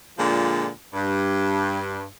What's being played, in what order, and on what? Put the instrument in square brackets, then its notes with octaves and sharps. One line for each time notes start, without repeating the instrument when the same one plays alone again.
[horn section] A#2 D3 F3 G#3
G2